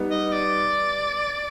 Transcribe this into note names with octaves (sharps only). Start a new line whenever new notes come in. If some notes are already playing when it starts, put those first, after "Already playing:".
Already playing: G3 B3 D#4
D#5
D5